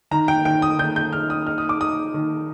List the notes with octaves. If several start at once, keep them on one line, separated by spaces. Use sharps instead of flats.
D#3 A#5
G5
D#3 G5
D#6
D#3 G6
G6
D#3 F6
D#6
D#4 F6
D#6
D6
D#4 D#6
D#3